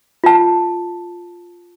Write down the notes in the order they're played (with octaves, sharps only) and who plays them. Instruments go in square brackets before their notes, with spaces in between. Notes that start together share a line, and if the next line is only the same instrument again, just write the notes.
[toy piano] F4 A5